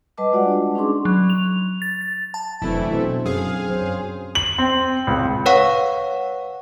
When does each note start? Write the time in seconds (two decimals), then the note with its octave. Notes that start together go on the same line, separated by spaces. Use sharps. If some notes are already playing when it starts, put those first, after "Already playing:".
0.18 G3 B4 D#5 A5 D6
0.33 G#3 F4 F#4 D5 F#5
0.46 D4
0.75 C#4 D#4 G#4 C6 D6
1.05 F#3
1.30 F7
1.82 A6
2.01 A6
2.34 A5
2.62 F1 E3 F#3 A3 C4 D4 E4
2.92 B2 C4 C5
3.25 F#2 G#4 F5
3.70 F#3 C#4 C5
4.35 F#7
4.58 C4
5.07 C#2
5.46 B4 C#5 F5 F#5 C#6